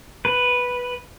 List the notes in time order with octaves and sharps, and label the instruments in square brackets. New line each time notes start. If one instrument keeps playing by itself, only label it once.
[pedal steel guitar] B4